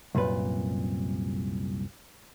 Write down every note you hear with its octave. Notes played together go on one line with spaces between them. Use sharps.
C2 F#2 A#2 B4